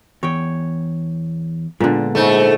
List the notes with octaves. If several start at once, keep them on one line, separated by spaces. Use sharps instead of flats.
E2 C#5 G5
A#2 D3 G#3 B3 D4
G#2 A3